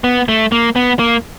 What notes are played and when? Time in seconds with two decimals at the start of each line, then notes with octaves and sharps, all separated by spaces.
0.04 B3
0.28 A3
0.52 A#3
0.76 B3
0.99 A#3